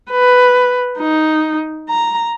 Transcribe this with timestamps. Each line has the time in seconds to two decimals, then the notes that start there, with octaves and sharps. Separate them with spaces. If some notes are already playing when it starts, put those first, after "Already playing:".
0.11 B4
0.99 D#4
1.89 A#5